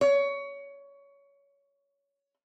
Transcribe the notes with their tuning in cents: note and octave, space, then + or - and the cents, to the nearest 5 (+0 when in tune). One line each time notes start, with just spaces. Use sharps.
C#5 +20